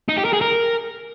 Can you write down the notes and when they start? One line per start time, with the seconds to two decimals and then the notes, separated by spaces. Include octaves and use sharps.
0.09 D#4
0.17 G4
0.25 A#4
0.33 G#4
0.41 A#4